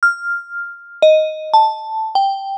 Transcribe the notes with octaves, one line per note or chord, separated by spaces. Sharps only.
F6
D#5
A5
G5